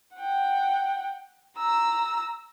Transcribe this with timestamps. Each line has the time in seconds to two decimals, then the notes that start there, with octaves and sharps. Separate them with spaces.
0.16 F#5 G5
1.58 A#5 E6